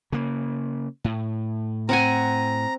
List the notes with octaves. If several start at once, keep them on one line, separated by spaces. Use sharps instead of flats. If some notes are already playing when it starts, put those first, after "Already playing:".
C#3 A#3
A2
C4 F#5 G#5 A#5